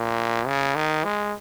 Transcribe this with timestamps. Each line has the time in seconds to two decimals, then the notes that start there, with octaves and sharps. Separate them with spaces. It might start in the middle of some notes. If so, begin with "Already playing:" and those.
Already playing: A#2
0.47 C#3
0.76 D#3
1.04 G#3